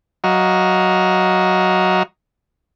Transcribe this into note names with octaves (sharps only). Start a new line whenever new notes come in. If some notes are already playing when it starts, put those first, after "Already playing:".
F#3 F#4 D#5 F5 A#5